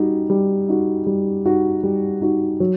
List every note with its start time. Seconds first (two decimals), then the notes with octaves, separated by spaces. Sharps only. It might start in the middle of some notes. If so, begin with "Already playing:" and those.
Already playing: G3 D#4 F#4
0.30 G3
0.69 D#4 F#4
1.06 G3
1.46 D#4 F#4
1.83 G3
2.21 D#4 F#4
2.60 F#3